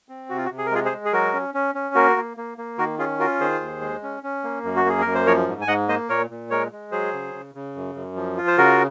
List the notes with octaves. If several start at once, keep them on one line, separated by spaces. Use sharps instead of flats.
C4
C3 F#4
F4
F#4
C3
G#4
A#4
G#3 F4 G#4
G#4 C5
G#3
G#4
F#3 F#4 A#4
C#4
C#4
C#4
A#3 F#4 A#4
A#3
A#3
A#3
D#3 F#4 A#4
C#4 F4 G#4
F4 F#4 A#4
D#3 G#4 C5
D#2
G#3
C#4
C#4
A#3
F#2
F#4
A#3 G#4
F#2 A#4
C5
F3 A#4 C#5
G#2
G#5
G#2 D#5 F#5
A#3 C5 D#5
A#2 A#4 C#5
A#2
G#3 A#4 C#5
G#3
F#3 G#4 C5
C#3
C#3
C#3
F#2
F#2
F3
F4
C5
C#3 F#4 A#4